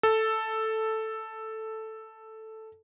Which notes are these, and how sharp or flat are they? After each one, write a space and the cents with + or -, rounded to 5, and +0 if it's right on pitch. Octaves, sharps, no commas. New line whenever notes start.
A4 +0